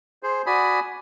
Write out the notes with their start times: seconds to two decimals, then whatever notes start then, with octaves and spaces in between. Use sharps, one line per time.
0.23 G#4 C5
0.46 F#4 D5 G#5 B5 D#6